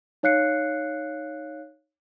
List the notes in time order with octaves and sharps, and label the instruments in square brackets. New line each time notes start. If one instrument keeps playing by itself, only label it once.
[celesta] D#4 C#5 F5 F#6 C7 C#7